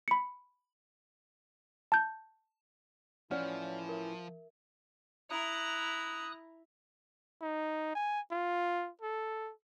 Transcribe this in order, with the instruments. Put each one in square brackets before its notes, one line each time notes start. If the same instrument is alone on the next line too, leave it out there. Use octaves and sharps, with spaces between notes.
[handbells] B5 C#7
A5 G6
[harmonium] A2 E3 E4 [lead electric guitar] F3 [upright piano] C#4 [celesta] D5 F#5 F6
[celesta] A#4 E5
[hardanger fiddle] E4 A#5 [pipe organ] D#6 F#6
[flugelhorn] D#4
G#5
F4
A4